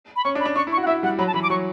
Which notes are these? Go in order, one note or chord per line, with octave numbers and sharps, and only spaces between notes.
B5
C#4 C#6
D4
B5
D4
D4 C#6
E4
C#6
F#4
F#5
E4 E5
G3 F#5
F#3 B5
A5
E3 B5
D6
F#3 C#6